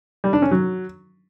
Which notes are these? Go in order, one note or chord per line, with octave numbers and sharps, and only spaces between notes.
G3
D4
C#4
F#3